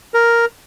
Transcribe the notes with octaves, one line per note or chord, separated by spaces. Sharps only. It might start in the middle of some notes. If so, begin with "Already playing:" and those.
A#4